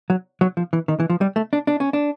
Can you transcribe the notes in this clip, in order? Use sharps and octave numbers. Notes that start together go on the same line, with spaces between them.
F#3
F#3
F3
E3
D#3
E3
F3
G3
A3
D4
D4
C#4
D4